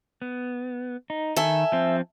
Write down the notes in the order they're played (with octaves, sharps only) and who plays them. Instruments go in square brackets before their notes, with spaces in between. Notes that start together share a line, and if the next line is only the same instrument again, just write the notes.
[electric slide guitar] B3
D#4
[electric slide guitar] D#3 [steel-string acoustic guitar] A4 E5 G#5
[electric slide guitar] F3 C4